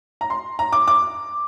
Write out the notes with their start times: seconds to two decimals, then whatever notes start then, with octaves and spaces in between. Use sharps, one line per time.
0.21 A#5
0.30 C6
0.59 A#5
0.73 D6
0.88 D6